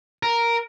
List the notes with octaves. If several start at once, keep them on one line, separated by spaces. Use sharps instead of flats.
A#4